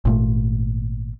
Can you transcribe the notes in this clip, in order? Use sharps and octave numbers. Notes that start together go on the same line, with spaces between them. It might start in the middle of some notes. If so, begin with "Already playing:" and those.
G#1 A#2 A3